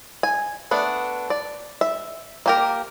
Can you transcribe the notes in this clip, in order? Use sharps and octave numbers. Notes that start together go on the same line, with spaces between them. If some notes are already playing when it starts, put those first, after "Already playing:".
G#5
A3 B3 D4
D5
E5
A#3 G4 A#4